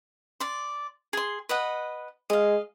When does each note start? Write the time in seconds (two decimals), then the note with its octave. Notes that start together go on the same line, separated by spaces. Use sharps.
0.40 D5 C6
1.13 G#4 C6
1.49 B4 D#5 F#5
2.30 G#3 D#5 F5